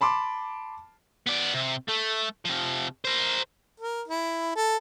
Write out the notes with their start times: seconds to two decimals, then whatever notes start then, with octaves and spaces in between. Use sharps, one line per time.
0.01 A5 B5 C6 D6
1.27 B3 D5
1.54 C3
1.88 A3
2.45 C3 F3
3.05 A#4 C5
3.80 A#4
4.08 E4
4.55 A4